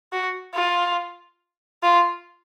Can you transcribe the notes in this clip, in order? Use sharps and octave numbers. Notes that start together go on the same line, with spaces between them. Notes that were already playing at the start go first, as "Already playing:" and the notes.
F#4
F4
F4